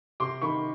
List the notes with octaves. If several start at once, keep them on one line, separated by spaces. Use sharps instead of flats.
C3 C6 D6
D#3 B5 C#6